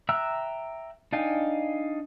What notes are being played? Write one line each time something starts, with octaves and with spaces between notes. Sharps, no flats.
E5 G5 A#5 E6 F#6
D4 D#4 F5 G5 G#5